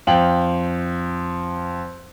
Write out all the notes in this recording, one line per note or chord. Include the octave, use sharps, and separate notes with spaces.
F2 F5 G5 F#7